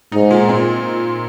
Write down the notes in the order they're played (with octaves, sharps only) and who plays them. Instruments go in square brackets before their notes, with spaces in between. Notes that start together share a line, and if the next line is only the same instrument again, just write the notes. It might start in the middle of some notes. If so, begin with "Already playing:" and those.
[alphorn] G#2 [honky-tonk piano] D#4
[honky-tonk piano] A#2
C4